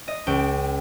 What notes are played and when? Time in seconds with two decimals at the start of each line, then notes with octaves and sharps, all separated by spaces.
0.08 D#5
0.27 C#2 G5